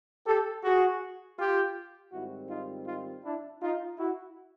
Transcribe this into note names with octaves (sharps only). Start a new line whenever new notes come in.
G4 A4
F#4 G#4
F4 G4
G#2 D#3 G3 C4 E4 F#4
D#4 F4
D#4 F4
D4 E4
D#4 F4
E4 F#4